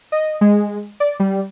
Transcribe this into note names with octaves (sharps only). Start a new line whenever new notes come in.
D#5
G#3
D5
G3